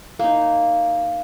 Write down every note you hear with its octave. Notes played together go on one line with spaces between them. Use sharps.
A#3 D#4